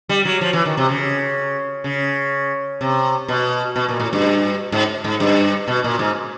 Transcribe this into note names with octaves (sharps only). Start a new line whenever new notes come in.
G3
F#3
F3
E3
D#3
C3
C#3
C#3
C3
B2
B2
A#2
A2
G2
G#2
G#2
G2
B2
A#2
G#2